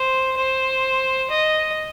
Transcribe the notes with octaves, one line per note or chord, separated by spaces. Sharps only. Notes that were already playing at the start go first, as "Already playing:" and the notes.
Already playing: C5
C5
D#5